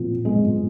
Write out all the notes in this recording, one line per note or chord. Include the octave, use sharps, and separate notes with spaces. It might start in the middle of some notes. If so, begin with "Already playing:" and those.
Already playing: A#2 F3 C4
G#3